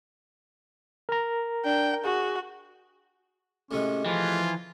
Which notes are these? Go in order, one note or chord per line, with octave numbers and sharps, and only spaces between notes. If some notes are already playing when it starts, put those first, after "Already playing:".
A#4 A#5
D4 G5
F#4 G#4
A2 C3 G#3 C#4
E3 F3 F4